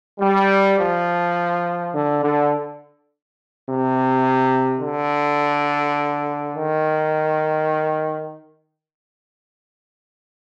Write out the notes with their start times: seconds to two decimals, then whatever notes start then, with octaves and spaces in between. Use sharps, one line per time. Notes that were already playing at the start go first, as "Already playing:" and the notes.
0.20 G3
0.78 F3
1.93 D3
2.22 D3
3.66 C3
4.81 D3
6.54 D#3